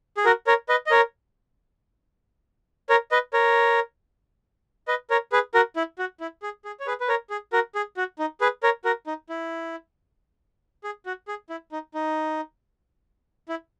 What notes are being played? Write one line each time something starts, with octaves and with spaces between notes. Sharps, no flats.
G#4
F#4 A#4
A#4 C#5
B4 D#5
D#5
A#4 C#5
A#4 C#5
B4 D#5
A#4 C#5
B4 D#5
A#4 C#5
G#4 B4
F#4 A#4
E4
F#4
E4
G#4
G#4
C#5
G#4 B4
B4
A#4 C#5
G#4
F#4 A#4
G#4
F#4
D#4
G#4 B4
A#4 C#5
F#4 A#4
D#4
E4
G#4
F#4
G#4
E4
D#4
D#4
E4